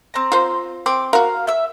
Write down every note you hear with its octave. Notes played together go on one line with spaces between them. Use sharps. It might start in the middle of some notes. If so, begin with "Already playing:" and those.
C4 A#5
F4 C5
C4 D6
F#4 A#4 F5
E5 E6